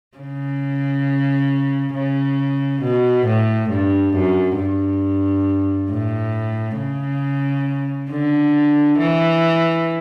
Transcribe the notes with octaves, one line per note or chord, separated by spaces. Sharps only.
C#3
C#3
B2
A2
G2
F#2
G2
A2
C#3
D3
E3